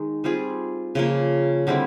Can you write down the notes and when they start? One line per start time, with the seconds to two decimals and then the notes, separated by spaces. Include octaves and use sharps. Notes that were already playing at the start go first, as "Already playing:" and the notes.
Already playing: D#3 G#3 D#4
0.24 G3 C4 F4 G#4
0.95 C#3 F3 A#3
1.67 D3 G3 C4 E4